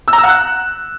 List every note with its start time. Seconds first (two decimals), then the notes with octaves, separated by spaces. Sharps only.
0.08 E6
0.13 A#5
0.18 E6
0.23 F#5
0.29 F#6